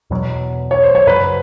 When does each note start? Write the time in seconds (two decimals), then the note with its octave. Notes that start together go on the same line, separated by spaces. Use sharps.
0.10 E2 B2 F#3
0.71 C#5
0.84 C5
0.95 C#5
1.07 F#2 C#3 F#3 B4